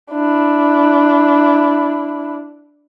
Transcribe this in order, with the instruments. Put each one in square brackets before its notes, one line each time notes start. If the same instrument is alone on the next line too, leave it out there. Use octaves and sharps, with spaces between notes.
[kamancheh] D4 E4